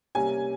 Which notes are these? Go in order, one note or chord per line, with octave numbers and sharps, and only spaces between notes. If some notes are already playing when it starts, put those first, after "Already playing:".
C3 G3 A#3 C#4 G#5